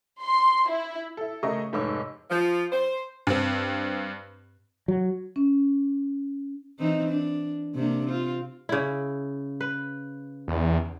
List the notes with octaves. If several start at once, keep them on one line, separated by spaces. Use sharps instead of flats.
C6
E4
E4 A4
C#3 A3 G#4 A#4 D#5 C#6
F1 G#2 G#3 C#5 D6 E6
F3
C5
G2 C4
F#3
C#4
E3 C4 D#4
D4
C3 A#3 D4
C4 F4
C#3 E4
B4
E2